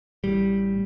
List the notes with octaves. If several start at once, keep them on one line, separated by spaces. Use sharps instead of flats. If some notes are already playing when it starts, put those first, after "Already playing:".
A1 A2 G3